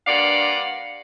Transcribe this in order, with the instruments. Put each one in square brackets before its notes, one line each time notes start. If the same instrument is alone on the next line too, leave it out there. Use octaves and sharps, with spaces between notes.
[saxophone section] G2 A#3 D4 D5 F5 F#5